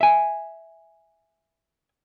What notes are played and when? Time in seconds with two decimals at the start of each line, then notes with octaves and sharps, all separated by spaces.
0.01 E5 G#5